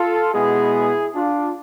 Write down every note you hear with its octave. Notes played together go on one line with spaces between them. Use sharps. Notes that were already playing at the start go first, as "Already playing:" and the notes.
Already playing: F4 A4
B2 G#3 B3 E4 G#4
D4 F4